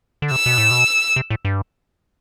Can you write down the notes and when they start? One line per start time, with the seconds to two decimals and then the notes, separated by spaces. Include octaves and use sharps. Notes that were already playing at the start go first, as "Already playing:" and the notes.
0.22 D3
0.31 C3 E6
0.46 B2
0.58 A2
0.71 B2
1.16 C3
1.30 A2
1.45 G2